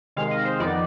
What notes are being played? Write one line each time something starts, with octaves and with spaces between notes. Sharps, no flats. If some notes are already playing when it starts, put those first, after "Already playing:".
C3 D#3 G#3 F5
D#5
C5
F2 D#3 B3 D#4 D5